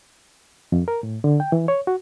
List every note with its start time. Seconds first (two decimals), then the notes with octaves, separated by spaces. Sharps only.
0.72 F2
0.88 A#4
1.03 A2
1.24 D3
1.40 G5
1.52 E3
1.68 C#5
1.87 F#4